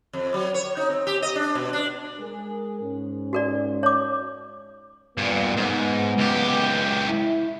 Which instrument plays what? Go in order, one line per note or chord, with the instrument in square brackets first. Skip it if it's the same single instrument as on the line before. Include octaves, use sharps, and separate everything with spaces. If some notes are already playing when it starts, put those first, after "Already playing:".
[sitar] F2
F#3
C#5
D#4
C4
G4
D#5
D4
B2
D4
[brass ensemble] G#3 G#4 A#4
G#2 C#4
[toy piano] F#4 A#4 D5
C#5 D6
[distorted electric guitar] G2 A#2 [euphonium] B3
[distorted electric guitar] G#2
C#2 G4
[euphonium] E4